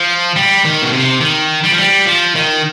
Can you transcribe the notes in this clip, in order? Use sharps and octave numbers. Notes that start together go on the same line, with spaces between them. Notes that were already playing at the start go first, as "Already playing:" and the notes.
Already playing: F3
G3
D#3
B2
C3
D#3
G3
F3
G3
F3
D#3